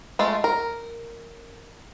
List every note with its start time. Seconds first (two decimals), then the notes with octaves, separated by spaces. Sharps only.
0.19 G#3 A3 F4
0.44 A#4